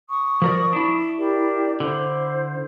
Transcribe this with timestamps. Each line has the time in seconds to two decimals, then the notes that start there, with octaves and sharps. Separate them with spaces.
0.10 C#6 D#6
0.42 F3 A#4 D5
0.73 D4 E4
1.18 G4 A#4 D5
1.80 D3 E4 C5